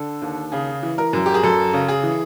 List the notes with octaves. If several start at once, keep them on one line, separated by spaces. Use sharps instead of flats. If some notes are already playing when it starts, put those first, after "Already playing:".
Already playing: D3 A4
D#2
C#3 G#4
E3
A#4
F#2
G4
G#4
F#2 A4
C#3
G#4
E3